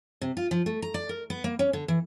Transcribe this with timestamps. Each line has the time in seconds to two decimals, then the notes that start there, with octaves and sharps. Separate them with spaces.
0.22 C3
0.37 F4
0.51 F3
0.66 A3
0.82 A#5
0.94 D5
1.09 A#4
1.30 B3
1.44 A#3
1.59 C#4
1.73 D3
1.88 E3